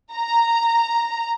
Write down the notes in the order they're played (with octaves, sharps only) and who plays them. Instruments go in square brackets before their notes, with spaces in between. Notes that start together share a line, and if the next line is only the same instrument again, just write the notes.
[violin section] A#5